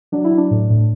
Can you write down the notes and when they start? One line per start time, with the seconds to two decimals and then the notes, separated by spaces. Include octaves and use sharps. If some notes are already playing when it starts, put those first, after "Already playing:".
0.12 F#3 D4
0.24 E4
0.31 F#3
0.37 D4
0.51 A2
0.70 A2